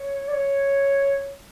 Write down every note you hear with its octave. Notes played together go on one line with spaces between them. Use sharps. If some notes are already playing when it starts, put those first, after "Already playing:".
Already playing: C#5
D5
C#5